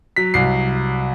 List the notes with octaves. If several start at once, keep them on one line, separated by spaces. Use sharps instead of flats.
F#3 B6
C2 C7